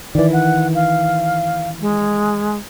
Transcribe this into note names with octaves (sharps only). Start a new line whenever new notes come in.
D#3 E3 D5
F#5
F5
G#3